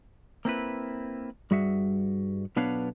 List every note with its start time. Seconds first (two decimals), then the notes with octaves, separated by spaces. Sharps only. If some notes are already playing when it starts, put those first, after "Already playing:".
0.45 A#3 C4 E4 B4
1.51 G2 G3 F#4 G#4 E5 F#5
2.56 B1 B3 D4 B4 C#5 F5